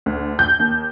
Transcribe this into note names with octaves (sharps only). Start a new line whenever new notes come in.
D2
G6
D#2